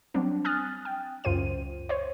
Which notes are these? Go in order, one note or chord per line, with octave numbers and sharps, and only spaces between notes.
F#3 G3 C4 D4
G#5 D#6 F6 F#6 A6
G5
C#2 F#2 F4 C5 D#7
C5 C#5